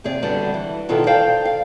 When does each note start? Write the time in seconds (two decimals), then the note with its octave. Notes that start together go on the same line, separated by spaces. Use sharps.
0.04 D#2 C3 G#4 D5
0.23 D3 G3 B3 F#4 D5
0.54 E3
0.89 B2 D#3 F4 A4 D5
1.07 C5 D5 F5 G5
1.45 F5